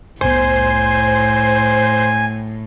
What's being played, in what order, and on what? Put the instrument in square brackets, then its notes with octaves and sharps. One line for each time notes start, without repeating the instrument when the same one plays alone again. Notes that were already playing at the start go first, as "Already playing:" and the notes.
[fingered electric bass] F1 C2 B3 [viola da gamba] A2 [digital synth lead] C5 [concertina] G#5